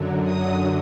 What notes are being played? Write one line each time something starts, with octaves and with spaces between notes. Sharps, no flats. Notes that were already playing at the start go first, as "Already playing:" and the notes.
Already playing: F#2 D3 F#3
D#6